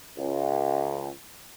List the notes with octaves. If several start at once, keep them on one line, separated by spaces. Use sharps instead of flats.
C#2